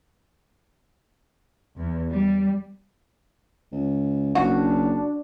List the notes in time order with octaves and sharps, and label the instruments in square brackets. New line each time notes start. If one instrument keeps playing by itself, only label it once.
[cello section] E2
G3
[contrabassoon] C#2
[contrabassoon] F#1 [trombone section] D4 [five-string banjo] F#4